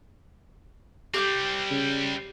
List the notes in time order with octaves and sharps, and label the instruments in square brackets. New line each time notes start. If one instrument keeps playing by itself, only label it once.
[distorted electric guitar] G3 C4 [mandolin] G4 F#6 G6
[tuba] C#3